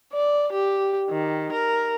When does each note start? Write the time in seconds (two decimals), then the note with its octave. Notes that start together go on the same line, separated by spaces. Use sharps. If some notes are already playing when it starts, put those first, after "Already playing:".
0.13 D5
0.52 G4
1.10 D#3
1.52 A#4